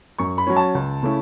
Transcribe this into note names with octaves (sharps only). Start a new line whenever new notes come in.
F#2 C#6
B5
F#3 C#4
A5
C#2
C#3 A3 C#4 E4